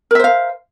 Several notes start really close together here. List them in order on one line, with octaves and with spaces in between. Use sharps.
A#4 E5 C5 F5